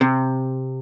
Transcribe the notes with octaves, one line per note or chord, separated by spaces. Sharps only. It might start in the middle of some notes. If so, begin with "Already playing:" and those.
C3